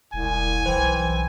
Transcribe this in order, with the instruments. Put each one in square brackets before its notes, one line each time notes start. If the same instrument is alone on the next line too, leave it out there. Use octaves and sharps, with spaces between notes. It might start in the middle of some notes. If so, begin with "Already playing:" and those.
[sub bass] E1 [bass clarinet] C2 [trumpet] G#5
[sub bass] B1 [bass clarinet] E3 [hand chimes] C5 G5